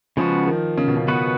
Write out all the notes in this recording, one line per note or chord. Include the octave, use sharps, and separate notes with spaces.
C#3 F3 G#3 B3 F#4
D#3
C#3
B2
C#3
B2 B3 F#4 B4